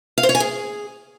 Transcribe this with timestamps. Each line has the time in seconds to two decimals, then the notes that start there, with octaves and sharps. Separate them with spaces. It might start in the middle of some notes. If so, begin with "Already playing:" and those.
0.18 F5
0.23 C5
0.29 C#5
0.35 G#5
0.40 G#4